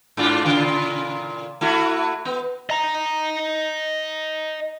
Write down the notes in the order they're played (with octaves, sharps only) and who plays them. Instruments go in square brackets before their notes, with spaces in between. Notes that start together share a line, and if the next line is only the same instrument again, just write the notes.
[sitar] G#2 D4 F4
A#2 C#3 F4
A3 E4 F#4
B3
[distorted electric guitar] D#5 A#5